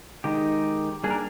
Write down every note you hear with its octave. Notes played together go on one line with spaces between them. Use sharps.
D#3 G#3 D#4 G4
G3 A#3 D4 G#4
A#4